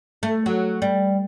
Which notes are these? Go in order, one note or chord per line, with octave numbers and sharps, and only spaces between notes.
A3
F#3
G3